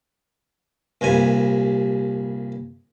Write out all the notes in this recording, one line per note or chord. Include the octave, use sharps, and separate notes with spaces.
C2 G2 A#2 G#5